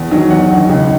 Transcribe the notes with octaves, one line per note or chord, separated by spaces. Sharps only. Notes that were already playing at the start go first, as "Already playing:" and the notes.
Already playing: E2
D#3 F#3
E2 F#5
D#3 F#3
C#2